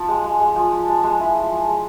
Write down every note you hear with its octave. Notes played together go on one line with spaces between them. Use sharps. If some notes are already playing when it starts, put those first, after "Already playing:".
Already playing: F3
G#3
G#3
G#3
F3
F3
G#3
G#3
E4
F3
F3
G#3